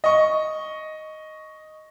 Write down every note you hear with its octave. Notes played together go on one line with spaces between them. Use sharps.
D#5 C#6